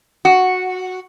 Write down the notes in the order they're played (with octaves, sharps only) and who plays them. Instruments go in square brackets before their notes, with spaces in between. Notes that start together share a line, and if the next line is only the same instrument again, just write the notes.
[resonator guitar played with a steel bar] F#4